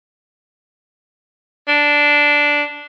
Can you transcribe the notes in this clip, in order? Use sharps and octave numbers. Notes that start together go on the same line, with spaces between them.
D4